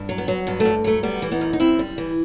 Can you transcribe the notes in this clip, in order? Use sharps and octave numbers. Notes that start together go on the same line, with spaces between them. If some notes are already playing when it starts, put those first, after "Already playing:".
Already playing: G2
F#3
B3
F#3
G2 B3
A3
G2
F#3 A3
G3 B3
E3
B3 D#4
F#2
D#4
F#2 C4 E4
G3
E3